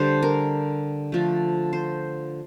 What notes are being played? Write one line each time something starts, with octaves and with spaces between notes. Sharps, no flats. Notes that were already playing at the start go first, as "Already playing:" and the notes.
Already playing: D3 G3 D4 C5
A#4
D3 F3 A3
C5